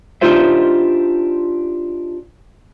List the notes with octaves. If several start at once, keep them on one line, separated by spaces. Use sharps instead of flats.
D4 D#4 F4 G4 C5 E5